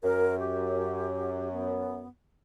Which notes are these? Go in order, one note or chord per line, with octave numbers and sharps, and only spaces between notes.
F#2 A#4
G4
B3